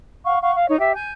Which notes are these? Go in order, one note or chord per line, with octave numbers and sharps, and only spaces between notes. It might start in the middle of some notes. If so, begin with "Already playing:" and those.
F5 F#5 C#6
F5 F#5 C#6
F5
D#4 C#5
G4 E5
G#5 G6